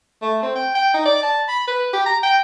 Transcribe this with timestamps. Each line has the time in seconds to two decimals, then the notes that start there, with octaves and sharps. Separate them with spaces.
0.22 A3
0.43 C4
0.55 G5
0.75 G5
0.94 D#4
1.06 D5
1.23 A5
1.48 B5
1.67 B4
1.93 G4
2.06 A#5
2.23 G5